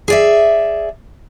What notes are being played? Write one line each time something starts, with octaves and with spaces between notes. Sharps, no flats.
G#4 D5 E5